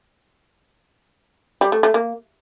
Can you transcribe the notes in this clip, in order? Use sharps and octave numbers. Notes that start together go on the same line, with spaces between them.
G3
A3
A3
A#3